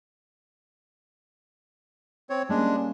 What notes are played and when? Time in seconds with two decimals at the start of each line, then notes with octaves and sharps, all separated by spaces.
2.30 C4 C#5
2.49 G3 G#3 A#3 C#4 D4